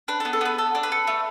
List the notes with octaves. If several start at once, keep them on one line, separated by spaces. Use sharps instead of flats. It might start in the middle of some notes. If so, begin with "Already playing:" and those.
D4 B4
A4
B3
A4
B3 B4
A4
D4
B4
A4
A3